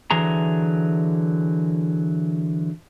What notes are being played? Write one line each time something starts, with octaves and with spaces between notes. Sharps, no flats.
D3 E3 F#3 G#4 A#5